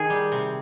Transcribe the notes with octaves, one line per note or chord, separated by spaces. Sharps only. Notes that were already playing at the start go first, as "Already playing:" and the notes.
Already playing: D#3 G#4
G3
C3